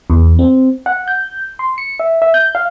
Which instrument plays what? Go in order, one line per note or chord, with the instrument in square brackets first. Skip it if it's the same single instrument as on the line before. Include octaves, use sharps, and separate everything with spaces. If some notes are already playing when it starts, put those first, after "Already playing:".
[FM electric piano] E2
C4
F#5
G6
C6
C#7
E5
E5
G6
F5